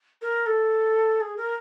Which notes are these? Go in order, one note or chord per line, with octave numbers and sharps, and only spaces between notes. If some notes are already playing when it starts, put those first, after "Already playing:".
A#4
A4
G#4
A#4